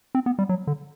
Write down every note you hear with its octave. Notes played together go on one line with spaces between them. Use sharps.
C4
B3
G3
F#3
D3